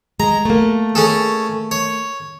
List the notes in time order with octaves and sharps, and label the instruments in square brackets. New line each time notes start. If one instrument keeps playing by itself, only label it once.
[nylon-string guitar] G#3 [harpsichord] A#5
[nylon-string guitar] A3 A#3
[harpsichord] C#4 G#4 A4
C#5